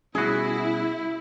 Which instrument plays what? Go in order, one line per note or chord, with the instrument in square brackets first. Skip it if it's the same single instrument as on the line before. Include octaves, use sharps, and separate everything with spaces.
[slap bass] B2 G3 C#4 [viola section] E4 [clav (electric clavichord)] F#4 G#4